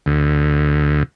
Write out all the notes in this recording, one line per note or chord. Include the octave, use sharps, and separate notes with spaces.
D2